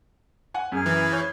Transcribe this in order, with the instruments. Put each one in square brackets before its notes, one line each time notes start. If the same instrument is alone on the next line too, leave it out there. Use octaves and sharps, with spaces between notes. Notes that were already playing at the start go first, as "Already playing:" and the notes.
[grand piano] F#5 G#5
[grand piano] F#2 [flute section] G#4 F6
[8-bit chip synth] E3
[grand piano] C#5 G6